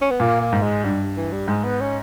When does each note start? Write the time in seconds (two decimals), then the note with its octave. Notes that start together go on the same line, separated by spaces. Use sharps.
0.01 C#4
0.11 B3
0.20 A#2 A#3
0.42 A#3
0.52 G#2
0.63 G#3
0.84 G2 G3
1.17 E3
1.32 G3
1.48 G#2 G#3
1.64 B3
1.81 C#4